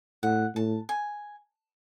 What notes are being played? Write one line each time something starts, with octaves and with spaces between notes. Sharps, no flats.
A2 F#5
A2 A5
G#5